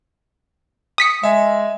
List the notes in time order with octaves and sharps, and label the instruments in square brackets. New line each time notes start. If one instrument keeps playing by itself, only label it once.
[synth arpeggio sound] D#6 B6 C#7
[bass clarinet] G#3 [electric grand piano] E5 G#5